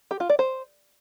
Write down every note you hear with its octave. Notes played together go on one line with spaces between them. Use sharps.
G4
F4
D5
C5